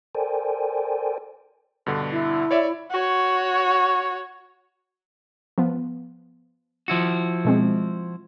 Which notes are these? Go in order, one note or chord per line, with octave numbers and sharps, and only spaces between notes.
A4 A#4 C5 D5 G5 G#5
G2 B2 D3
E4
C#5 D5 E5
F#4 C#5
F3 B3
F3 E4 F#4
B2 G#3 C4